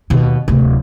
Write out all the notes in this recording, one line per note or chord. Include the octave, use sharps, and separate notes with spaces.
D#2 B2
D1 C3